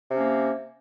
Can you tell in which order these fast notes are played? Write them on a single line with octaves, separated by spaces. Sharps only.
C3 C#4 A#3